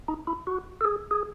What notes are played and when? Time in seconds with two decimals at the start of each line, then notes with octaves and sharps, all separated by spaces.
0.08 D#4
0.27 E4
0.47 F#4
0.81 A4
0.85 G#4
1.11 G#4